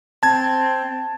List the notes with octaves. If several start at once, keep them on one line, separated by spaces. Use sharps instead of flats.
C4 A5 G#6